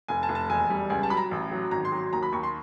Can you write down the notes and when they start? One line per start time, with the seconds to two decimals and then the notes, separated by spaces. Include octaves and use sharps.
0.08 F1 G#5
0.23 A5
0.29 F1
0.35 A5
0.49 E1 G#5
0.70 G3
0.90 C#2 G#5
1.03 A5
1.10 F#3 B5
1.17 A#5
1.31 A1
1.51 F#3
1.71 G#1 A#5
1.85 C6
1.92 F#3
2.13 D#2 A#5
2.23 B5
2.32 D#2 C#6
2.43 C6